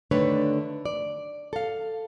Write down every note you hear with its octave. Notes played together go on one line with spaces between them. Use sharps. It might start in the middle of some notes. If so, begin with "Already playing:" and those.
D3 D#3 A3 D4 B4 C#5
D5
A4 F5